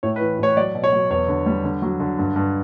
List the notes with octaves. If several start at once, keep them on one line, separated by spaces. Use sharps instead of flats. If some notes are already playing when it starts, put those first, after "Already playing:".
A2 C#5
B4
E3
A2 C#5
F#3 D5
B2
C#5
F#3
E2 C#5
D3
G3
D3
F#3
D3
G2
G2